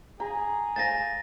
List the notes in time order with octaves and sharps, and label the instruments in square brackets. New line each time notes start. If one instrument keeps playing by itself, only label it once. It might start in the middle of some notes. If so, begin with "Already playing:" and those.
[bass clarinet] G#4 [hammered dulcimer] A#5
[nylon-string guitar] C5 F5 G#5 [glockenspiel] A6 A#6